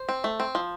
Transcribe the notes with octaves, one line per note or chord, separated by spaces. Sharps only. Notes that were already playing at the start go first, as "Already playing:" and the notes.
Already playing: C5
C4
A3
C4
F3